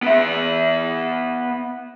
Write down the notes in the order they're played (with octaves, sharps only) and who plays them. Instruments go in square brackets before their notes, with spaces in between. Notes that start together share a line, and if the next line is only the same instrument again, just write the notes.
[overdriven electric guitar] B3 E5